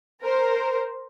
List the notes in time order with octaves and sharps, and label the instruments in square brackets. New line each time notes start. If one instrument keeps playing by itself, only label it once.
[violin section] A#4 C5